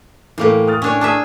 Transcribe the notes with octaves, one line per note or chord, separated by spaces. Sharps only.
A2 E3 A3 A#3 G4
D#6 F6 A6
C#4 D4 C#5
D4 G#4 E5 A5